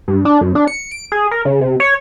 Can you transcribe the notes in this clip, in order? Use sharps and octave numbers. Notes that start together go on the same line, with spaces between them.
G2
D4
F#2
D4
C#7
D7
G#4
A#4
C#3
C3
C#5